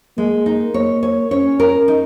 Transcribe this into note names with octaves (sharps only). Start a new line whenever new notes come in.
G#3 A#3
D#4
A#3 C#5
C#5
C#4 C#5
A#4
D#4